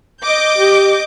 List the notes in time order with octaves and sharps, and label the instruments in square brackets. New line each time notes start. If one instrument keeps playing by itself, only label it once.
[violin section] D#5 D6 G6
[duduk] G4